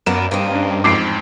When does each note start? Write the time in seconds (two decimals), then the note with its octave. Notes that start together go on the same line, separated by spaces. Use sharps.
0.06 F#2 A#3 B3 D4 E7
0.31 G2 A#3 C4 D#4
0.51 C#4 D4
0.84 A1 F2 G#2 D6 C7 D7